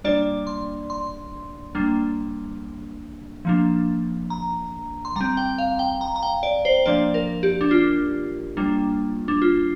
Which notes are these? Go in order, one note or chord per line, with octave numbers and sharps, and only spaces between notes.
G3 A#3 D4 D5
C6
C6
G3 A#3 D4
F3 A#3 D4
A#5
C6
G3 C4 A#5
G5
F5
G5
A#5
A#5
G5
D5
C5
F3 A#3 D4 D5
A#4
G4
D4
F4
G3 A#3 D4
D4
F4